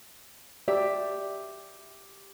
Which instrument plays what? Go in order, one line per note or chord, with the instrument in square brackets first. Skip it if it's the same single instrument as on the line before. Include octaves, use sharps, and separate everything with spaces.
[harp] G4 [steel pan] D5 [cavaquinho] E5